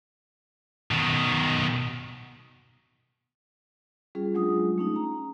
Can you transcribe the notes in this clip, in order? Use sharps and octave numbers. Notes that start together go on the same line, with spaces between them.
B2 D#3
G3 C#4 F4 G#4
F#3 G#3 D4 F4 G#4 D#6
A3 C#4 D#4
A#5